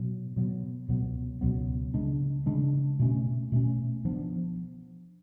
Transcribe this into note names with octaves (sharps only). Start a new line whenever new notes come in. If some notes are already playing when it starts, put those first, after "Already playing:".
Already playing: B2 F#3 B3
B2 F#3 B3
C#2 B2 F#3 B3
C#2 B2 F#3 B3
C#3 G#3 D4
C#3 G#3 D4
B2 A3 C#4
B2 A3 C#4
F3 B3 D4